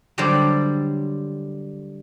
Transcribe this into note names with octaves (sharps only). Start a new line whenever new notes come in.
D3 F#3 G3 A4 C5 D5